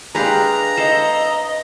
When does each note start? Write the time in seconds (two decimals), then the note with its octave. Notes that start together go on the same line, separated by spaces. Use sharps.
0.15 G#3 D4 G4 B4 F5 A#5
0.77 A4 C5 D#5